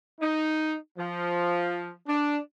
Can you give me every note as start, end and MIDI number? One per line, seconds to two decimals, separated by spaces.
0.20 0.75 63
0.97 1.94 53
2.07 2.38 62